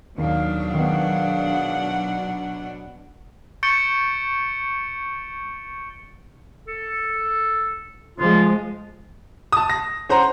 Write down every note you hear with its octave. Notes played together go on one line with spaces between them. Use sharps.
D#2 B2 F#3 D4 G#4 F5
D#3 B3 F#5
C#6 G6 A6 C#7 D7 G7
A4
F3 G#3 F4
A5 D#6
A#6
C#4 C5 F#5 A#5